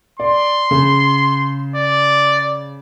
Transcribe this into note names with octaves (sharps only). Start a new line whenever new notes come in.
D5 C6
C#3
D5